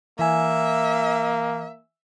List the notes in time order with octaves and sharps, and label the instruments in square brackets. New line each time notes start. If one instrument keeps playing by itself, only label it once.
[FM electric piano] E3 G#5 [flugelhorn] A#3 [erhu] E5